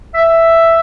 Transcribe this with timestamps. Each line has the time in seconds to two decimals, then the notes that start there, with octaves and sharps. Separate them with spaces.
0.14 E5